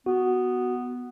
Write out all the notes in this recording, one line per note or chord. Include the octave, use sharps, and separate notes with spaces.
B3 F#4